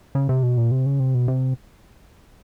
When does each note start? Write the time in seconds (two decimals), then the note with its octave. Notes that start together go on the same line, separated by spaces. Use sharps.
0.15 C#3
0.29 C3
0.43 B2
0.57 A#2
0.71 C3
0.86 C#3
1.00 C3
1.15 B2
1.28 C3